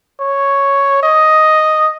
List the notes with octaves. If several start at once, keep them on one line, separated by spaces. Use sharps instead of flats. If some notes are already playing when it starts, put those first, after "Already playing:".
C#5
D#5